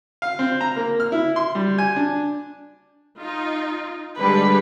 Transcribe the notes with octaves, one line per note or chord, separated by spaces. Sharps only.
F5
C4
A#5
A#3
F6
E4
C6
G3
G#5
D4
D#4 F4
D3 G3 G#3 B4